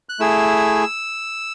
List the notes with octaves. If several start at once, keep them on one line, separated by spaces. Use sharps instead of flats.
F#6
A3 E4 G#4 E6